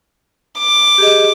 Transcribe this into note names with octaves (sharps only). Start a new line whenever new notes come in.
D6
G4 G#4 D#5